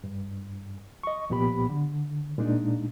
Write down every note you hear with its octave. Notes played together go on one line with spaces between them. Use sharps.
G2
D#5 C#6
C2 A#2 F3 B3 G4 B5
D3
A#2 G#3 D4 D#4